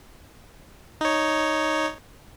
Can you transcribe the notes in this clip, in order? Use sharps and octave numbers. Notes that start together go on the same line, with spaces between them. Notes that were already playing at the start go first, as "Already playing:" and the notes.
D#4 C#5